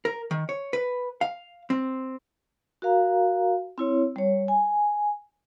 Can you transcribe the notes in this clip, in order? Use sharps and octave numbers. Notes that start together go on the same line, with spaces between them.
A#4
D#3
C#5
B4
F5
C4
F#4 A#4 F5 A#5
C4 E4 C#5
G3 C#5
G#5